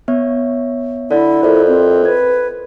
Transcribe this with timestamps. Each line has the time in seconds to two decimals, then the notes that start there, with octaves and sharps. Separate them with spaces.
0.08 B3 C#5 E5
1.11 D3 E4 A4
1.43 F2 A#4 D5 E5
1.68 C4
2.05 B4 G#6